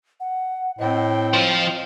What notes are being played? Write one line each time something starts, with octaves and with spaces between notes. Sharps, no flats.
F#5
A2 C4 D#5 G5
F3 C5